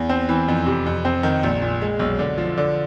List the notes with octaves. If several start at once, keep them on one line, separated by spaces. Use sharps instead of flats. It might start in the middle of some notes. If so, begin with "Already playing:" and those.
Already playing: E2
C4
E3
F2
C3
F2
C4
D#3
A#1
A#2
G#3
B1
D3
F3
D3